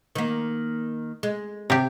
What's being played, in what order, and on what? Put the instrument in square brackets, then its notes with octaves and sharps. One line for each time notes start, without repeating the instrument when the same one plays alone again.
[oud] D#3 A#3
G#3
[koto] C3 G4